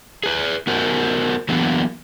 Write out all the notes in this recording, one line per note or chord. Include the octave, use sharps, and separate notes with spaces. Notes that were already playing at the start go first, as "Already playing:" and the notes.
G#4 B4
B3 F#4 A#4 C5
E3 F#3 A#3 B3 D4